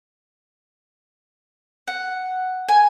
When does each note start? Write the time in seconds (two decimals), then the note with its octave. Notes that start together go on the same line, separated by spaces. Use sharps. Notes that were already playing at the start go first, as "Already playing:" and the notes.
1.88 F#5
2.69 G#5